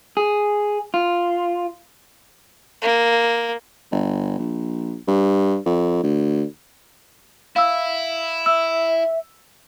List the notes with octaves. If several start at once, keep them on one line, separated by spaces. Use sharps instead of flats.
G#4
F4
A#3
G1
A#1
G2
F2
D2
E4 F5 E6
E5 E6